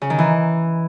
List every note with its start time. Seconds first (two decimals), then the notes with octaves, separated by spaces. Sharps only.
0.02 C#3
0.10 D#3
0.18 E3